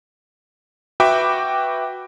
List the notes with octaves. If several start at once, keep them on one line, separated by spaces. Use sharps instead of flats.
F#4 B4 E5 G5 B5 D6